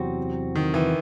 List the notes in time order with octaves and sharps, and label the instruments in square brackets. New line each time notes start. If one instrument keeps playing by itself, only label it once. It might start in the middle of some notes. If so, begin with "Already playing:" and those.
Already playing: [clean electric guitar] E2 C3 F#3 C4 F#4
[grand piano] D#3
E3